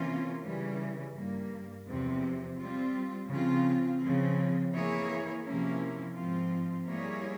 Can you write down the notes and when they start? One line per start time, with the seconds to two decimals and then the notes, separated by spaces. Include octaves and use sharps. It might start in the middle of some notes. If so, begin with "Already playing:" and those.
Already playing: C3 E3 A#3 C#4 F4
0.43 C#3 E3 G3 C#4
1.15 G2 G3 A#3
1.86 E2 C3 F3 C4
2.58 G3 C4 F4
3.29 C#3 F3 C4 F4
4.01 C#3 F3 C4
4.73 E3 A#3 E4 G#4 C#5
5.44 C3 F3 A#3 C#4 E4
6.16 G#2 F3 C4 F4
6.88 G3 A#3 E4 G#4 C#5